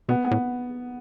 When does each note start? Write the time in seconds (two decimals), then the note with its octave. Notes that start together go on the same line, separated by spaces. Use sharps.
0.09 B2 B3
0.24 B3
0.31 A2